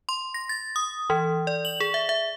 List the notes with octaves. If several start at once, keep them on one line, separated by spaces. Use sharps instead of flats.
C6
A#6
A6
D#6
E3
D5
F#7
G#4
E5
E5